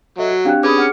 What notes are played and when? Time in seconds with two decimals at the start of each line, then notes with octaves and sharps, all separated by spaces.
0.18 F#3 A4 D#5 E5
0.31 F#4
0.45 C4 D4 G4 F5 G5 F#6
0.63 C#4 G#4 B4 B5 D6 D#6
0.78 F#5 F6 C#7